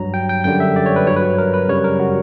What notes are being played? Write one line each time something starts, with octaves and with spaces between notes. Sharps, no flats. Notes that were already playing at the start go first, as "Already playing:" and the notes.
Already playing: G2 F#3 A#5
G5
G5
F#2 D3 G3 G5
E5
D5
C#5
B4
G2 F#3 C#5
B4
A#4
B4
F#2 C#3 G3 C#5
A#4
F#4